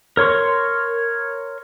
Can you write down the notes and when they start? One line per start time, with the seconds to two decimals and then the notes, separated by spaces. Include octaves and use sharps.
0.17 A#4 C#5 C6 C#6